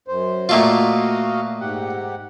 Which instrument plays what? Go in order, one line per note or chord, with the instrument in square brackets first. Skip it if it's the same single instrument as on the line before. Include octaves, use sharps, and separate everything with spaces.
[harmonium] F#2 C5
[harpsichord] A#2 A3 F4 [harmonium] F#4 D#5 F5
[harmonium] G#2 G4 F#5